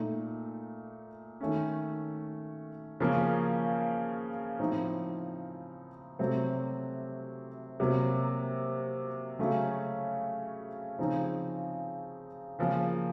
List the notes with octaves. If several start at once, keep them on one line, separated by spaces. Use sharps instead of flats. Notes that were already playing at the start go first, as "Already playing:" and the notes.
Already playing: A#2 A3 D#4
D#3 A3 C#4
C#3 F3 A#3 C#4
A2 F3 C4 D#4
C3 F#3 A3 C4
C3 F#3 A#3
C#3 F#3 A3 C#4
C#3 F3 C4 D#4
C#3 F3 A#3